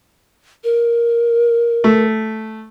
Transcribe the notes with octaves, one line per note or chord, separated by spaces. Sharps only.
A#4
A3